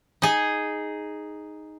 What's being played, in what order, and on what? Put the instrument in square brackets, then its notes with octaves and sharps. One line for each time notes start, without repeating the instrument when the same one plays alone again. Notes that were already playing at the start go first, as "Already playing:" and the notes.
[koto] D#4 G#4